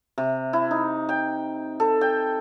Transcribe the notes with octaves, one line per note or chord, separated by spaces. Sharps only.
C3
E4
D#4
G5
A4
G5